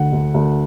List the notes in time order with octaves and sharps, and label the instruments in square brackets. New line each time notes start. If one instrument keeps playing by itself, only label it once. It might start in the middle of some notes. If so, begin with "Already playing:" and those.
Already playing: [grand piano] D2 D3 F#5
D2
D2